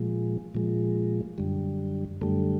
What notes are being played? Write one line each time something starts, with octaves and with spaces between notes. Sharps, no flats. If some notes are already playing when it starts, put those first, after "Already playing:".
Already playing: A#2 F3 G#3
A#2 F3 G#3
F#2 D3 G3
F#2 D3 G3 A3